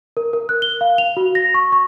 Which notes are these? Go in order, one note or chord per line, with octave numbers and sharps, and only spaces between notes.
A#4
A#4
F#6
G7
F5
F7
F#4
A#6
C#6
C#6